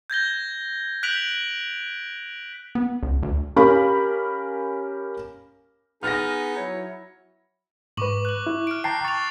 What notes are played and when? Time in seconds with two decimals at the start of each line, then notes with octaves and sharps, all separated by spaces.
0.10 G6 G#6 A#6 G7
1.03 F#6 G6 B6 D7 F7 F#7
2.75 B3
3.03 C#2
3.23 D2
3.56 C#4 G4 A#4 F5 B5
6.03 B3 D#4 G#4 F6 A6 A#6
6.57 F#3 E4 C#5
7.97 G#2 B4 C#6 D6 F#7
8.25 F#6 F#7
8.47 E4
8.67 F6 D7
8.84 G5 A5 A#5 C7 D7
9.05 C#6 A6 F7